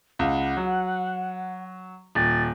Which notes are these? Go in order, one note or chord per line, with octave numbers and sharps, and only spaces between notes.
C#2 F#5
F#3
D#1 A6